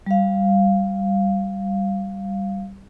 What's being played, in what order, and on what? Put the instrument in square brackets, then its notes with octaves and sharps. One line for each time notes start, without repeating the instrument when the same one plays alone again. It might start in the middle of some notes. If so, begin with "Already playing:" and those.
[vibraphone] G3 F5